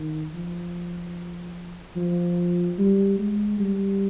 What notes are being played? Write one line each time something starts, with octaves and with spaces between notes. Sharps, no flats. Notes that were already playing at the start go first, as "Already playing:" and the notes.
Already playing: D#3
F3
F3
G3
G#3
G3